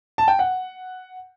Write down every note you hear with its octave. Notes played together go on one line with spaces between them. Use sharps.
A5
G5
F#5